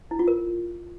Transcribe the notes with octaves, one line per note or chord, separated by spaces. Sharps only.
E4
F4
A#4